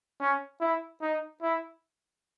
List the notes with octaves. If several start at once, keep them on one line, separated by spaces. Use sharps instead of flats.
C#4
E4
D#4
E4